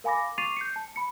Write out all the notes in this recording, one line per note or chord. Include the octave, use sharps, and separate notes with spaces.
A#4 F5 G#5 B5 D6 A#6
C#6 D6 A6 C7 D#7 F7
G6 C7 C#7
A5
B5 C#7